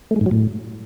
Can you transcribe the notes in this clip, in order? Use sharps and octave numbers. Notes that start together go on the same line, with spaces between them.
A3
G#3
G#2
F#3
A2